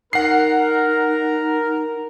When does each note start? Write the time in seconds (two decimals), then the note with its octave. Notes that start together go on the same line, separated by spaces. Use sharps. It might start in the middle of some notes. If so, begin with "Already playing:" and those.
0.13 D#4 A#4 F#5 C7